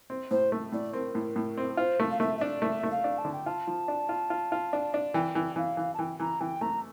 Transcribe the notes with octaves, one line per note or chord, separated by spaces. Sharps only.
C4
A2 C5
A3
A2 D5
C4 A#4
A2
A2
C4
F4 C5
A3
F5
A3 E5
E5
D4 D5
A3 E5
A3
F5
D4
A5
D3
G5
F4 A5
F3
D4
F4
F4
F4
D4
D4
E3 G5
E3
E3 F5
E3
A5
E3 G5
E3 A#5
E3 G5
A3 A#5